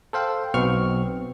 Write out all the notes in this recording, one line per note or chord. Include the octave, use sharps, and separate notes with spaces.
A4 C5 F5 G5
B1 B2 B3 C4 C#6 F6